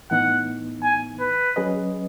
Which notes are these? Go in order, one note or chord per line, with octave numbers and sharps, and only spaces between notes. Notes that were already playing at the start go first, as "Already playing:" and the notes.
A2 E3 B3 D#4 F#5
G#5
B4
F#3 C#4 G#4 B4 D#5